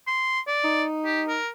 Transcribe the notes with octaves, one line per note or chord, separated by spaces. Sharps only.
C6
D5
D#4
G4
A#4